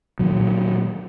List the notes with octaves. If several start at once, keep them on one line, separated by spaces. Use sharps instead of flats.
A#2 D#3 F#3